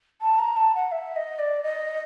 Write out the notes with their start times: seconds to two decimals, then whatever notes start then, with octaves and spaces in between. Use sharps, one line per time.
0.21 A5
0.39 A#5
0.57 A5
0.75 F#5
0.92 E5
1.16 D#5
1.39 D5
1.63 D#5